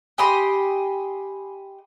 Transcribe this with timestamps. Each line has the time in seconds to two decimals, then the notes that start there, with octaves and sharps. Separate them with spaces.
0.18 G4 D#5 G#5 B5 C6